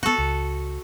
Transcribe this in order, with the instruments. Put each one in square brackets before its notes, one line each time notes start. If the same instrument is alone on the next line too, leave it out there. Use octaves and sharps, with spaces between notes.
[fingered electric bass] B3 C4 [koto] F#4 A4
[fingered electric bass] C#2